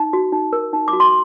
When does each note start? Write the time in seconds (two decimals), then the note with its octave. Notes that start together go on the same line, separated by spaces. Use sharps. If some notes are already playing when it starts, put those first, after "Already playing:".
Already playing: D#4
0.13 F#4
0.32 D#4
0.53 A#4
0.73 D#4
0.88 D6
0.93 F#4
1.00 C6